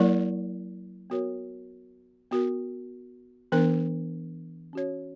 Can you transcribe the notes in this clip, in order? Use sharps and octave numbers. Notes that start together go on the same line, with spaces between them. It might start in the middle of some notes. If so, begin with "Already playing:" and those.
Already playing: F#3 A#3 E4 A#4 D5
B3 F#4 A#4 C#5
B3 F#4 A#4
E3 B3 D4 A#4
C#4 F#4 C#5